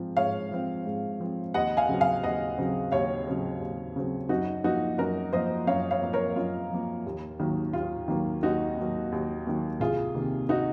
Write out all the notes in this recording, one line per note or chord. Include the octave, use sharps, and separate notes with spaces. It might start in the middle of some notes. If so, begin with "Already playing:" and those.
Already playing: G#2 F3 C4
G#2 C#5 F5
F3 C4
G#2
F3 C4
D#2 D#5 F#5
F5 G#5
C#3 F#3 C4
F5 G#5
D#2 D#5 F#5
C#3 F#3 C4
D#2 C#5 F5
C#3 F#3 C4
D#2
C#3 F#3 C4
F#2 D#4 F#4
F3 A#3 D#4 F#4
F#2 F#4 A#4
F3 A#3 C5 D#5
F#2 C#5 F5
C#5 F5
F3 A#3
A#4 C#5
F#2 F4
F3 A#3
D#2
D#3 F#3 A#3
D#2 F4
D#3 F#3 A#3
D#2 D#4 F#4
D#3 F#3 A#3
D#2
D#3 F#3 A#3
C2 F4 G#4
C3 D#3 A#3
D#4 F#4